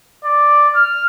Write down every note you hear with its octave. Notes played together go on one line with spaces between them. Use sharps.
D5
F6